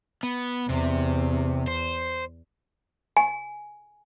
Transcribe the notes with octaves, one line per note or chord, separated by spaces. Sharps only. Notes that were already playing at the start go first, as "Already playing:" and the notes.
B3
E2 C3
C5
G#5